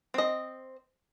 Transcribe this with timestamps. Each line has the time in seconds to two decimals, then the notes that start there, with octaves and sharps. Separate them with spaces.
0.14 C4 D#5